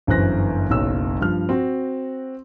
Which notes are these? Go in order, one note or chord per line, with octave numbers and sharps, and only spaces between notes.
G1 F#2 E3 C5 F#6 A#6
F#1 B1 C#4 E6
G2 F3 F6
C4 F#4